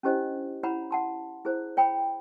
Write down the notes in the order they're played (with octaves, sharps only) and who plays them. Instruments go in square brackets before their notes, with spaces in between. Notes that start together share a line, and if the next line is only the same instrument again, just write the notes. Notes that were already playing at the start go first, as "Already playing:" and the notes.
[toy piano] C#4 D4 E4 G4 C5 D#5
E4 C#5 F#5 A#5 B5
F#5 A5 C6
E4 G#4 C5
C#5 G5 A#5 B5